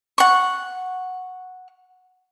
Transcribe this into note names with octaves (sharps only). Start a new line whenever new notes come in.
F#5 C#6